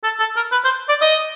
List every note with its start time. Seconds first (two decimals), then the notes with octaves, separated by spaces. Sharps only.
0.03 A4
0.19 A4
0.36 A#4
0.52 B4
0.65 C5
0.89 D5
1.01 D#5